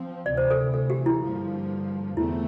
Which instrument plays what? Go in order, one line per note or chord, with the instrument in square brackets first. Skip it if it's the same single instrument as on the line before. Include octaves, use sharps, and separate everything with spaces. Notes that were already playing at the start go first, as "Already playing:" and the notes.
Already playing: [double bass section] F3 C4
[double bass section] D2 C3 E3 [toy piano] D5
[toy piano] C5
A4
A4
G4
E4
[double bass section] G2 D3 F3 A#3
[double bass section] E2 D3 A3 C4 [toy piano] E4